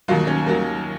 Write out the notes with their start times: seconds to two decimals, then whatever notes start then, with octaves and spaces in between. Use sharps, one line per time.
0.08 D#2 D#3 F#3 F4
0.27 C#4
0.46 D#2 D#3 F#3 A#4